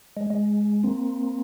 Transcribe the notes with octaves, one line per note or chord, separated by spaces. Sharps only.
G#3
G#3
A#3 C4